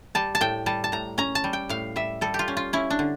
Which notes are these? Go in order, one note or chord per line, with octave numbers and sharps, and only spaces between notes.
G3 A5
A5
A2 G5
G3 A5
A5
A2 A#5
C#4 A#5
A5
G3
G5
A2 F5
G3 E5
G3 A4
G4
F4
C#4
F4
C#4 E4
D4
D3